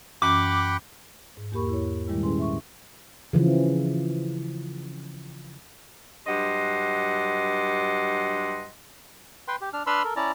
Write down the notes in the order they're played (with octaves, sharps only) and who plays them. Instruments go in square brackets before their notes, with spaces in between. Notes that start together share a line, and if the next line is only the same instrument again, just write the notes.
[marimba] F#2 E3 C#4 [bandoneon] F#5 G5 B5 [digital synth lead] D6
[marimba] G#2
E2 A#3 G4 A#4 B5 C#6
E4 C#5
A#2 D#3 G3 G#3 E4 G4
C#4 E4 G#4 B4 G#5 C6
E5 C#6
[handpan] C#3 E3 F3
[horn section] G2 F#3 D#5 F#5 C6
[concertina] B4 G5 C6
G4
D4 F6
D4 B4 B5 C6 E6 F6
A4 A#4
C#4 E4 D5 A5 A#5